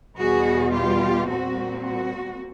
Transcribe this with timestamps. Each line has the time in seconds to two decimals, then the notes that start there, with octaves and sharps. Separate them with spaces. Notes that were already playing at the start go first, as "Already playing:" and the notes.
0.18 E2 B2 G3 F#4 G#4
0.74 F4 G4
1.29 A#2 G3 C4 F#4
1.84 F#4